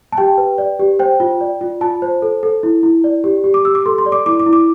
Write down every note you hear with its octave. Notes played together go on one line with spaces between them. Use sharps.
A5
G4 G5
B4
D5
G4
C5 G5
F4
D5
F4
F4 A5
C5
A4
A4
E4
E4
D5
G4
G4
D6
G4 E6
D6
A4 C6
C6
D5
D6
E4 D6
D6
E4
D6